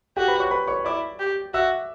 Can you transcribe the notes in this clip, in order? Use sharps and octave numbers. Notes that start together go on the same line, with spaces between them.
F#4 G4 G5
B4 B5
C#5 C#6
B4 B5
C#5 C#6
E4 D5 D6
G4
F#4 E5 E6